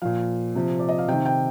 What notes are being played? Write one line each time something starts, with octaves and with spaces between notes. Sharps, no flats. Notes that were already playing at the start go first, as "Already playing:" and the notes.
A#2 F3 F5
C3 F3
D5
D#5
F5
C3 D#3 G5
G5